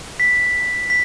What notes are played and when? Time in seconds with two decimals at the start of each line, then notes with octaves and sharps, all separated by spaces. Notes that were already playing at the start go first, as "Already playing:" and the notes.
0.20 B6
0.90 B6